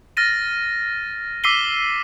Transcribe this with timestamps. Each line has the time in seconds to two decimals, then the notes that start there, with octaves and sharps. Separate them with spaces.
0.17 F6 A6 A#6 D#7
1.44 D6 E6 B6 C7 D#7 G7